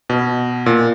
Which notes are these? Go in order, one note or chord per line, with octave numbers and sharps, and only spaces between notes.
B2
A#2